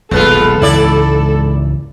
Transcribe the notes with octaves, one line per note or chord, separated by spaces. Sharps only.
D#1 B1 G#3 B3 F4 A4
C#2 G#2 E3 E4 D5